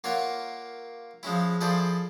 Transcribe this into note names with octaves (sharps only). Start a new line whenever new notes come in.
A#3 F4 C#5 E5 F#5
F3 G#3 C#4 E4
F3 E4 G#4 A4 C5 D5